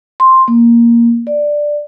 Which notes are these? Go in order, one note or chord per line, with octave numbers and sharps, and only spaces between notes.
C6
A#3
D5